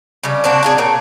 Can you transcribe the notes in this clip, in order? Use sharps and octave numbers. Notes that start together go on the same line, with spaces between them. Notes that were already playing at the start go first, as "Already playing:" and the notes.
C#3 G3
A#3 C4 D4 F#4
D4 E4 G#4
A#2 A#3 C#5 G5